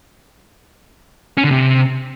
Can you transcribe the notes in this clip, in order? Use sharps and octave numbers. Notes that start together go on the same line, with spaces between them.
C#4
D3
C3